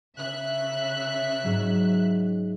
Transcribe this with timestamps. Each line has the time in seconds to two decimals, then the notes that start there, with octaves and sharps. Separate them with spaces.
0.17 C#3 E5 F#6
1.44 G#2 F#3